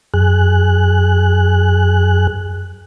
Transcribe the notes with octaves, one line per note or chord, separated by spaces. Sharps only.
F#2 G#4 F#6